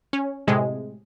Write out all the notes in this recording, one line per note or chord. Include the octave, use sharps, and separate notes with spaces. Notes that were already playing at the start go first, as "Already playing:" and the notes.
C#4
A2 C3 G#3